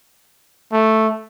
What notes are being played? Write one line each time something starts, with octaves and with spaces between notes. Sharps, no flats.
A3